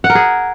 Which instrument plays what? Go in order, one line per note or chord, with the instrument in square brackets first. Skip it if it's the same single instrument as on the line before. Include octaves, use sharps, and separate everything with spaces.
[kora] F#5
A#4
G#4